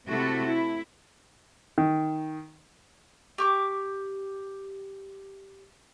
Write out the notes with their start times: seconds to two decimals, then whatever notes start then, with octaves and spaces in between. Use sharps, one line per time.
0.10 C3 A3 E4 F#4 A4
0.46 E4
1.78 D#3
3.38 G4 C#6 D6